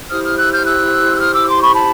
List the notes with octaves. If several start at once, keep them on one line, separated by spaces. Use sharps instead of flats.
E4 G4 C5 D#6 F6
D#6 F6
E6 F#6
F6 G6
E6 F#6
E6
D#6 F6
D6 E6
C6 D6
B5 C#6
A5 B5